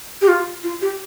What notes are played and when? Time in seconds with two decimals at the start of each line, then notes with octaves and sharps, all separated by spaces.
0.22 G4
0.28 F4
0.64 F4
0.82 G4